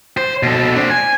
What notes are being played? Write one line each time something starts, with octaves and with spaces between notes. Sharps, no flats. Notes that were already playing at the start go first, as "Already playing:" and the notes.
C5
B2 A4
C4 D4
G#5